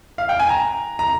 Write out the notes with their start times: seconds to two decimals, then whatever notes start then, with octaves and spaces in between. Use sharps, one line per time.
0.18 F5
0.29 G5
0.39 G#5
0.49 A#5
0.99 A#5